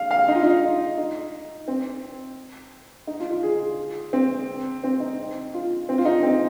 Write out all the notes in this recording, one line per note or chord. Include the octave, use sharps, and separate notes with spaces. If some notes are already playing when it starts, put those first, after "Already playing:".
Already playing: F5
F5
D#4
F4
D#4
D#4
C4
D#4
F4
F4
G#4
C4
C4
D#4
F4
C4
F4
D#4
C4